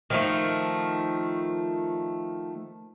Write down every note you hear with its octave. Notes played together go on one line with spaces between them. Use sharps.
D#3 F3 A3